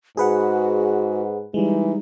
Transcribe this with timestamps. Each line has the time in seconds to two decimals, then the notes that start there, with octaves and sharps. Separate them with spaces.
0.17 G#2 F#4 G#4 B4 F#5
1.54 E3 G3 G#3 D#4